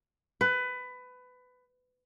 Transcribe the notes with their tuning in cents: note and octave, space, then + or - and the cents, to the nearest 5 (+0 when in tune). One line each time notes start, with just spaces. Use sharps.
B4 +20